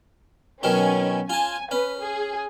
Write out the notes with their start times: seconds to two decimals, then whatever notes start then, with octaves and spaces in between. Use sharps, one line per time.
0.63 B2 D#3 F#3 C#4
1.29 F4 G#5 A5
1.71 C#4 B4
2.00 G#4